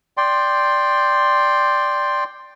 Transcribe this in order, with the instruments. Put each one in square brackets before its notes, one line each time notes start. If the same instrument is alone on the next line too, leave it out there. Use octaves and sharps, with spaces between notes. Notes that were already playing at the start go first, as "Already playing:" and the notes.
[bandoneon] D5 G5 C6